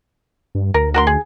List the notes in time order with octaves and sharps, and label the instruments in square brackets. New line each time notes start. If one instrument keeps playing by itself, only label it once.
[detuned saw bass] G2
[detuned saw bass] D2 [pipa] A#4
[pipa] F#4 A#4 C6
G#4